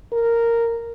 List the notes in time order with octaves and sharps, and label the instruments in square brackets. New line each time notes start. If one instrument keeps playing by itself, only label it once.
[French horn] A#4